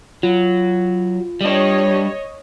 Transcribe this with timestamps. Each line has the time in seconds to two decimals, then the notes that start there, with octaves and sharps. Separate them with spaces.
0.23 F#3 F4
1.41 G3 D4 C#5 D#5